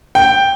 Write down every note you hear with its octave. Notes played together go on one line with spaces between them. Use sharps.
G5